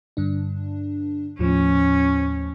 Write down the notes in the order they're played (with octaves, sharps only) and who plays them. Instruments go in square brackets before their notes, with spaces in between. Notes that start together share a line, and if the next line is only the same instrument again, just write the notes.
[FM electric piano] G2 D3 D4
[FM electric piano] D#2 A2 F3 [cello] C#4